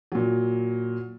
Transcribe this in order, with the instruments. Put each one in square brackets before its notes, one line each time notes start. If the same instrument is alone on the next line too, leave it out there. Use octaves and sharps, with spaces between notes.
[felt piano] A#2 F#3